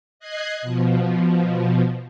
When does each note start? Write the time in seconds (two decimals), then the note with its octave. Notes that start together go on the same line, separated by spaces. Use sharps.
0.20 D#5 F#6 G#6 C7
0.62 B2 F3